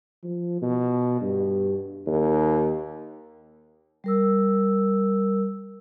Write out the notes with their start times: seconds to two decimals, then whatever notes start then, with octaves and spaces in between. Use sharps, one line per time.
0.24 F3
0.62 B2
1.21 G2
2.07 D#2
4.04 G3 A#4 E6